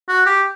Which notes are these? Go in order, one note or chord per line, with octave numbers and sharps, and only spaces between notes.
F#4
G4